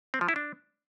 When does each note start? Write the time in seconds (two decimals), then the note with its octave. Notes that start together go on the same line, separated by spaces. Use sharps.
0.14 C4
0.21 F3
0.29 E4
0.36 D4